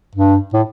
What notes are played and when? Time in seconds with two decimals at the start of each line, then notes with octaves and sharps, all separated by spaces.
0.15 G2
0.53 A2